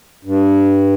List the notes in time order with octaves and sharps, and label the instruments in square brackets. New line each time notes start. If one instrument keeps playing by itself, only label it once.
[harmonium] G2